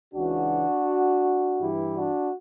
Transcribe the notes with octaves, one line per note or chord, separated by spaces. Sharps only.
C#2 C#3 E3 D4 F#4
G2 E3 E4 G4
D4 F#4